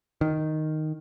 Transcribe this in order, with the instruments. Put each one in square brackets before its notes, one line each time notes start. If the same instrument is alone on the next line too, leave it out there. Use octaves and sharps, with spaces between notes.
[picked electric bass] D#3